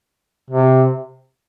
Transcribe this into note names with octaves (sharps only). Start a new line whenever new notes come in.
C3